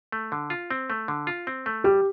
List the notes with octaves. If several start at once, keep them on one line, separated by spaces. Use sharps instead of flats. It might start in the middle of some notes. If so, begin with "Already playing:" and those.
A3
D3
F4
C4
A3
D3
F4
C4
A3
G3 G4